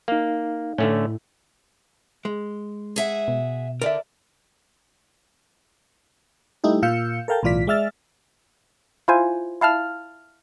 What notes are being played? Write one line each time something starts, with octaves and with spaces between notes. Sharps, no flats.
A#3 D#4 F5
A2 D3 A3 C#4
G#3
G#4 E5 F#5
B2
D3 A#4 D5 E5
G3 A3 D#4 E4 G4
A#2 F4 F5 E6 G6 C#7
A4 A#4 F5 G5 A5
B1 A2 E3 F4 D5 B6
G#3 D5 E5 F6 A6
E4 F4 C5 G#5
E4 F5 A5 F6